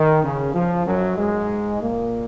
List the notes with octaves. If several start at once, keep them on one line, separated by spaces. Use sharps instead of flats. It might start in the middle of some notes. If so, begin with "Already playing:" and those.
Already playing: D#3
C#3
F3
F#2 F#3
G#2 G#3
A#2 A#3